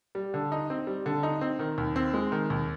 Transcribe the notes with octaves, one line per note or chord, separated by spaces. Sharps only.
G3
D3
D#4
C4
G3
D3
D#4
C4
D#3
D#2
C4
G#3
D#3
D#2